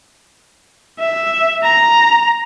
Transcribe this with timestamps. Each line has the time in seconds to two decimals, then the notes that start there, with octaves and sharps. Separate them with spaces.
1.00 E5
1.63 A#5